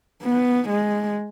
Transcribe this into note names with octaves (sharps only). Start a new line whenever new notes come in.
B3
G#3